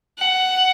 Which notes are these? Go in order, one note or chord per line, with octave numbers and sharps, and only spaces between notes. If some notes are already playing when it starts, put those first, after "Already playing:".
F#5